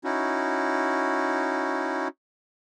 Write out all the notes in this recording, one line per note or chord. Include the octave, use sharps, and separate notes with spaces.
C#4 D#4 E4 F#4